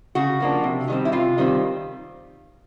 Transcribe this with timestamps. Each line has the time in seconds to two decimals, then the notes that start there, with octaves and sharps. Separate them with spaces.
0.15 C#3 F#4
0.40 F3 A#3 D4
0.63 C3
0.88 D#3 G3 C4
1.05 E4
1.12 C3 F4
1.38 D#3 G3 C4